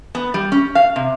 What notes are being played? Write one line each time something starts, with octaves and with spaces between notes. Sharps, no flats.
B3
G3
C#4
F5
C3